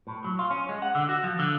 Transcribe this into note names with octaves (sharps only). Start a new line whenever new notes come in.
A2
F#3
F4
C#4
G#3
F#5
D3
F#4
F3
D3